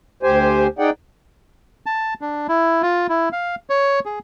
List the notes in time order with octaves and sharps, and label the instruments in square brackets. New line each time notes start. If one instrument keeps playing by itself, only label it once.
[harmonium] D2 G4 C5 G#5
D#4 G#4 D5 F#5 G5
[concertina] A5
D4
E4
F4
E4
F5
C#5
G#4